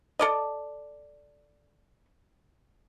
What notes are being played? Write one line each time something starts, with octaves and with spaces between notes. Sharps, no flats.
A4 D5 D#5